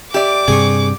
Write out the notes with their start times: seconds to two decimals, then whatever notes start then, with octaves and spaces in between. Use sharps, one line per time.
0.14 G4 D5 E5 D6
0.48 G2 C3 G#4 C#6